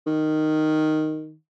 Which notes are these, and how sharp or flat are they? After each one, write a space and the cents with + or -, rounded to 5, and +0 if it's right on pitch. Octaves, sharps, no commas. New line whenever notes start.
D#3 -5